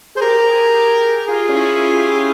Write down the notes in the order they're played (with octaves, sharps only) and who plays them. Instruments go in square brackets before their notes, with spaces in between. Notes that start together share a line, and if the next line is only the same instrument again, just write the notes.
[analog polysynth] G#4 [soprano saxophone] C5
[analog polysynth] G4 [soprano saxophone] A#4
[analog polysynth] G#4
G4
[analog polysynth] F4 [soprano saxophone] G#4
[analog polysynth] C#4
E4
F4
G4
F4
G4